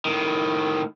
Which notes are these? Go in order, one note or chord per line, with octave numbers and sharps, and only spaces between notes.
A2 D#3